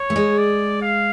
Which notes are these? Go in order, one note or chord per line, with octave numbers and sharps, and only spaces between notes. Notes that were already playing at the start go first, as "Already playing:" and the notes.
Already playing: C#5
A3
G#3
D5
F5